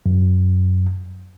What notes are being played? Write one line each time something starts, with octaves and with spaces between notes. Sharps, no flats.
F#2